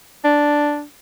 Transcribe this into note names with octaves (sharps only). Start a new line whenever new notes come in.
D4